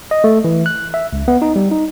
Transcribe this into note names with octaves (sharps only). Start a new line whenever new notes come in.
D#5
A3
E3
F#6
E5
C#2
B3
D#4
G3
D#4